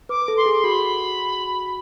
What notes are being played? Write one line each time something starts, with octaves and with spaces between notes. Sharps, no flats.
B4 D6
A4
C6
G#4
F#4 B5